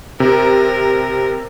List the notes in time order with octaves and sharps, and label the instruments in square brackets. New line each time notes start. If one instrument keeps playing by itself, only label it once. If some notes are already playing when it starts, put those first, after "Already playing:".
[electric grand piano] C3 [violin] A#4